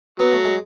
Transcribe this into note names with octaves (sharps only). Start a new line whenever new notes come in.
F#3 B3
A3
G#3